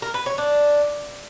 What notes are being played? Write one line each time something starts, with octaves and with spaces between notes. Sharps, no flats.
A#4
B4
C#5
D4